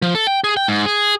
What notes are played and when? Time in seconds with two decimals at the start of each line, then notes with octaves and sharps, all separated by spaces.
0.02 F3
0.15 A4
0.27 G5
0.44 G#4
0.57 G5
0.68 G#2
0.86 G#4